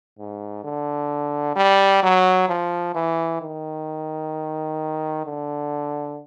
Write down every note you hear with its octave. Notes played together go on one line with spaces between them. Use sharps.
G#2
D3
G3
F#3
F3
E3
D#3
D3